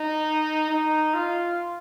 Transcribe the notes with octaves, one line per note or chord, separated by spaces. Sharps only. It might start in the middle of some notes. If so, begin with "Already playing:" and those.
Already playing: D#4
D#4
F4